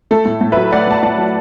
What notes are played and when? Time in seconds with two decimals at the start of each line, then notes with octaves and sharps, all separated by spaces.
0.11 A3 A4
0.26 A2
0.41 A2
0.52 F#3 B4 E5
0.72 A3 D5 F#5
0.88 A2 A5
1.03 A2 D5 F#5
1.18 F#3